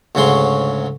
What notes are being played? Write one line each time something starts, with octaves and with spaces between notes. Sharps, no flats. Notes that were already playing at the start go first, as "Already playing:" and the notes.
D2 G#2 C#3 F#3 C#4 C6